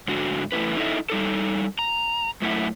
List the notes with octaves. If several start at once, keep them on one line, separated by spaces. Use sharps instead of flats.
G#2 D3 F#4
E2 A3 D#4 E4 B4
D#4 E4 A4 C5 D#5 E5
G3 D#4 A4
A#5
F#2 A3 E4 E5 F#5